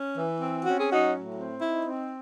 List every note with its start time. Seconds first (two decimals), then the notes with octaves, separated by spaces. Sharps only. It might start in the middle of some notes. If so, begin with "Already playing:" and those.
Already playing: C#4
0.17 E3
0.41 C4
0.65 C#4 F#4
0.79 G#4
0.89 F#3 D#4 F#4
1.13 A2
1.37 C4
1.60 D#4 E4
1.85 C4